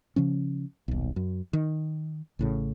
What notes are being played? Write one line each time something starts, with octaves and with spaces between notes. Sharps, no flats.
C#3 F3 C#4
D#1 B1
F#2
D#3
A1 A2 C#3